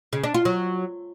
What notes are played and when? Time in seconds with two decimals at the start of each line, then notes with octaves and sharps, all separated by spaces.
0.13 C#3
0.24 D4
0.34 F4
0.45 F#3